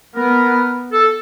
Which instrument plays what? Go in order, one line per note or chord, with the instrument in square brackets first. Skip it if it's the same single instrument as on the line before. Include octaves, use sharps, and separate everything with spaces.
[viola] B3 [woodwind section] A#4
[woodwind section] A4